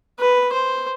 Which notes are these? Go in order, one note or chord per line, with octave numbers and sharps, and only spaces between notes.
B4
C5